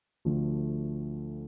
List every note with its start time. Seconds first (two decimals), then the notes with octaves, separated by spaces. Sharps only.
0.25 D2 D3 F3 A3